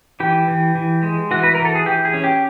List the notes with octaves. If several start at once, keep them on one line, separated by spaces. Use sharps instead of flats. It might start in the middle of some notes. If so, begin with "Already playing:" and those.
E3 G4
E3
E3
G#3
E3 F#4
B4
E3 A#4
A4
G#4
E3 G4
G#4
C#4
G4